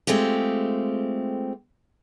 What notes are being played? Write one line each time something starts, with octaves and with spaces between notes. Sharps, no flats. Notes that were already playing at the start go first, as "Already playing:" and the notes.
G#3 A3 C4 F4 G4